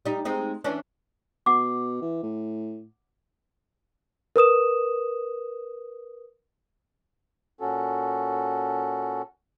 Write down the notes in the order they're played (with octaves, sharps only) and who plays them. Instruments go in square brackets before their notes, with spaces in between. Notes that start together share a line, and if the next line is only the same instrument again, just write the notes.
[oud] G3 D#4
G#3 C4 D#4
E3 C#4 D4
[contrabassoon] B2 [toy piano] F#5 D6
[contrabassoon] E3
A2
[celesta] A#4 B4 D#6 E7
[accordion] A#2 C#4 F#4 A4